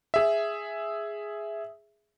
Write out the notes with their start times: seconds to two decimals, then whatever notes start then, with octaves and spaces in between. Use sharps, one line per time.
0.14 G#4 E5